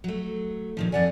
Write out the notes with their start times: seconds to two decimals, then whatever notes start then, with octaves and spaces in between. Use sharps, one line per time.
0.04 F#3 A3
0.77 A#2 D#3 F3
0.92 F2 D5 F#5 G#5